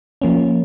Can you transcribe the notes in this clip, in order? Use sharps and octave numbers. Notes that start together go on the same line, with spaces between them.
F3 A#3 C#4